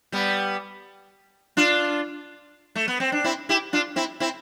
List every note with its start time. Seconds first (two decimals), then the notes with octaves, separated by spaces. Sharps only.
0.12 G3 B3
1.57 D4 F4
2.75 A3
2.88 B3
3.00 C4
3.12 D4
3.24 C4 E4
3.49 E4 G4
3.73 D4 F4
3.96 C4 E4
4.20 C4 E4